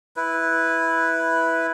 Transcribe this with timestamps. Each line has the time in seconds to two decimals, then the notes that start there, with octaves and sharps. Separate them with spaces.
0.16 E4 B4